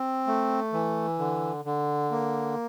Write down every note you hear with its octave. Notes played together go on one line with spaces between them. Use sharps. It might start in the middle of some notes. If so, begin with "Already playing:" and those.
Already playing: C4
A3
E3
D3
D3
A#3